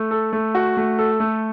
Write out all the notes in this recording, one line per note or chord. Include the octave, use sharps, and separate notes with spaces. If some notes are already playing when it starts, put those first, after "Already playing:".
Already playing: A3
A4
A3
F#4
A3
A4
A3